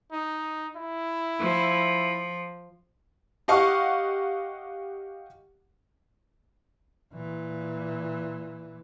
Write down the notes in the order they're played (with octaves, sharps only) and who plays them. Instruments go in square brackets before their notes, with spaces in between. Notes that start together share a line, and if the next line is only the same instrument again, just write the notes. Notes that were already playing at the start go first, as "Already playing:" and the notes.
[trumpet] D#4
E4
[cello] F3
[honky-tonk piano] G4 D#5 F5 F#5 C#6
[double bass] A#2 E3